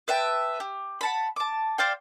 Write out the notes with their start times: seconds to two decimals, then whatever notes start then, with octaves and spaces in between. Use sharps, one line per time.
0.08 B4 E5 G5 A5
0.60 G4
1.01 F#5 A5 B5
1.36 A5 D6
1.78 C5 D5 F5 G5